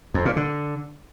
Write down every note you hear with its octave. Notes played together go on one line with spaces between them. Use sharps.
F2
A#2
D3